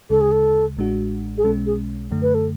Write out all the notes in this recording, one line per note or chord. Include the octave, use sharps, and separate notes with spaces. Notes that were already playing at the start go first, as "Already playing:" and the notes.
D2 C#3 G#3 A4
G#4
A4
A1 A2 G#3 D4 F#4
G#4
B1 B2 G#3 C#4 A4
G#4
F#2 D3 A3
B4
A4